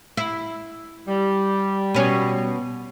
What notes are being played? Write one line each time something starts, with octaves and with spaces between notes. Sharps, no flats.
E4
G3
B2 C#4